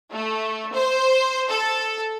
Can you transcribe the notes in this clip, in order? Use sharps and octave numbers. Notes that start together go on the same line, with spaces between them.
A3
C5
A4